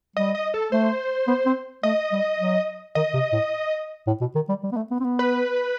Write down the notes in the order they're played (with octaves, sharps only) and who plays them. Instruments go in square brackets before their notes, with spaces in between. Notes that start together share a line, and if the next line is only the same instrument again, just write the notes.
[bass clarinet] G3 [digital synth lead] D#5
[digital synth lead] D#5
A4
[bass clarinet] A3 [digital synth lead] C5
[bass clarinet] B3
C4
[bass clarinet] A3 [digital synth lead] D#5
[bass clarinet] G3
F#3
[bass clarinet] D#3 [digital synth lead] D#5
[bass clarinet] C3
A2
A2
B2
D#3
G3
G3
B3
A3
B3
C4
B3
[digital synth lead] B4